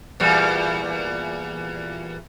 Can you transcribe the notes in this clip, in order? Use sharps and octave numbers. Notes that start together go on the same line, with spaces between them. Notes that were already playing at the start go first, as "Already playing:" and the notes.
E2 A#2 G3